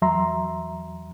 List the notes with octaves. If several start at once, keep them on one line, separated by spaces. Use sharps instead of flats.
E2 F#3 E5 A#5 C6